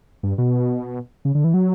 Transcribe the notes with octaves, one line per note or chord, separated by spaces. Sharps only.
G2
B2
C#3
D3
E3
F#3